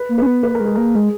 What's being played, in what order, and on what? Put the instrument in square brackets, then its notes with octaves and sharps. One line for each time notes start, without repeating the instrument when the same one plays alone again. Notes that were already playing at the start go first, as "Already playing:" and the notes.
Already playing: [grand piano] B4
[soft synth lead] A#3
[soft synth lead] C#4 [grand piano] B4
[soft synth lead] B3
[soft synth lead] A#3 [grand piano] B4
[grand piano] A#4
[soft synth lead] G#3
[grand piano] G#4
[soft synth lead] A#3 [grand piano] A#4
[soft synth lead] G#3 [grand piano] G#4